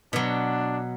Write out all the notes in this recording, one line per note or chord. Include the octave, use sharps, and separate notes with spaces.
B2 F#3 D4